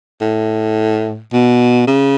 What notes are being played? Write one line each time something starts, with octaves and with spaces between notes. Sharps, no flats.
A2
B2
C#3